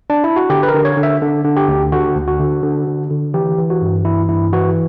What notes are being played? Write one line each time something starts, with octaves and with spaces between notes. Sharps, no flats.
D4
E4
F#4
D3 G4
B4
A#4
D3
C#5
D3
E5
D3
D3
G4
D2
D3 F#4
D2
F#4
D3
D3
D3
D3
E3 G4
E3
F#4
G2
E3 E4
G2 E4
E3 F#4